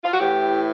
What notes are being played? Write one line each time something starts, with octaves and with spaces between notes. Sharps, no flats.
F4
F#4
A2 E3 G4